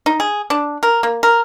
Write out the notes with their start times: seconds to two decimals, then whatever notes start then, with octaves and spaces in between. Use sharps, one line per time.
0.06 D#4
0.20 G#4
0.50 D4
0.83 A#4
1.03 A#3
1.23 A#4